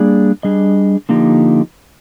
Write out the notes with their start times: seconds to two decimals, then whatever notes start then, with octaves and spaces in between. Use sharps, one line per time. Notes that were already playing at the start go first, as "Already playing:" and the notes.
Already playing: G3 A#3 D4 G#4 D5
0.43 G3 D4 G#4 D#5
1.09 D3 F3 A#3 D#4 G4